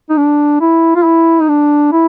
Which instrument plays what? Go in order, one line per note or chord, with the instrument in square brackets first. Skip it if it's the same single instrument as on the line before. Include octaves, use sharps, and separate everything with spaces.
[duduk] D#4
D4
E4
F4
E4
D#4
D4
E4